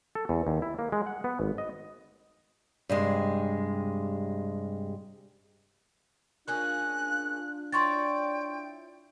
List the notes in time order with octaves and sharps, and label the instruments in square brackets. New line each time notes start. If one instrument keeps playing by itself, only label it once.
[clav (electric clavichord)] A4
E2
D#2
E4
A#3
G#3
F#5
B3
G#1
D#5
[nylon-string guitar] G2 C3 G#3
[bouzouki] A#3 C#4 G#4 [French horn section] D4 F4 [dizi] F#6
[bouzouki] E4 C#5 D5 [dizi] G5 [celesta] C6 C#6 A6